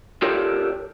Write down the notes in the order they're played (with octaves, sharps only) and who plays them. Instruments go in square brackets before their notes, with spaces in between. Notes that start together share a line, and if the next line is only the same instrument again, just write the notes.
[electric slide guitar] F4 G4 A4 A#4 C#5 D5